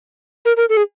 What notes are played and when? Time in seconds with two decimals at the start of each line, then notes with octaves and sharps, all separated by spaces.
0.45 A#4
0.57 A#4
0.69 A4
0.77 G#4